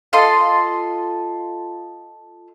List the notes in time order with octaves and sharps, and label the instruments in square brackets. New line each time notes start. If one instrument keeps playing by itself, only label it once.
[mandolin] F4 A4 D#5 C6